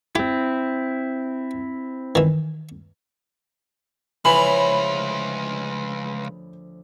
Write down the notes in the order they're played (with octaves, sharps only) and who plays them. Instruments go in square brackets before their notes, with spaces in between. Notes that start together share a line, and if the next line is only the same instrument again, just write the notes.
[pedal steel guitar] C4 E4 [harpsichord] G4
[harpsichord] D#3 E3
[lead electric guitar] C#2 [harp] C#3 F3 C#5 [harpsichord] E3 [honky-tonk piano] B5
[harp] D2